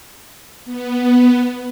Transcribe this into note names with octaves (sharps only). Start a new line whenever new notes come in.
B3